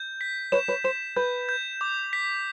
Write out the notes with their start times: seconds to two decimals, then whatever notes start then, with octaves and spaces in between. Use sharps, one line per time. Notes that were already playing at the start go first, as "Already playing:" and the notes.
Already playing: G6
0.21 B6
0.52 B4 C#5 E7
0.68 B4 C#5
0.84 C5 E7
1.16 B4 G6
1.49 G6
1.81 D6
2.13 B6